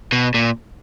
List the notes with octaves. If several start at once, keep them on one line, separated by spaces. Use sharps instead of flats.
B2
A#2